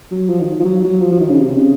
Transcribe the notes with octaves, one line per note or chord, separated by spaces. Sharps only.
F#3
F3
D#3
F3
F#3
F#3
F3
F3
D#3
C#3
C3
C#3